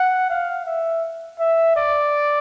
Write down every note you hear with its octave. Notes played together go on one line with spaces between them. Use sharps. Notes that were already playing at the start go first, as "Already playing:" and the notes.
Already playing: F#5
F5
E5
E5
D5